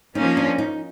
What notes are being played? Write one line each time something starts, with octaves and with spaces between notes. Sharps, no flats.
F3 A#3 C#4 D#4
D4
D#4